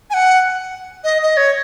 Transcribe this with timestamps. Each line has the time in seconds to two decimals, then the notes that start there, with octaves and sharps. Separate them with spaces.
0.10 G#5
0.14 F#5
1.04 D#5
1.23 D#5
1.37 C#5